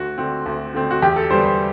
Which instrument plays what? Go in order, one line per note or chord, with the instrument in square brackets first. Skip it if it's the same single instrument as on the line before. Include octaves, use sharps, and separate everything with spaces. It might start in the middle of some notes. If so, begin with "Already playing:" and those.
Already playing: [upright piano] D2 F#4
D3 A3 C4
D2
D3 A3 C4
F#4
E2 G4
A4
D3 G3 B3 C5
C5